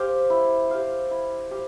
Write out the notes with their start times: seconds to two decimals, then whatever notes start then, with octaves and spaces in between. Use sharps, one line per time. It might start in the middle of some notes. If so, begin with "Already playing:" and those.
Already playing: G4 C5 F5
0.30 E4
0.71 G4 C5 F5
1.11 E4
1.51 G4 C5 F5